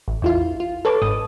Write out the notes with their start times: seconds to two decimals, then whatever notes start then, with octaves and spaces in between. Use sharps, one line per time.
0.08 A1
0.22 E2 E4 F4
0.60 F4
0.85 A4 B4 C#5 A5 D6
1.02 G1 G#2 A4 D#6